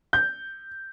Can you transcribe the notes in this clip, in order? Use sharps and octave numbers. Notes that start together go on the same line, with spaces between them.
G6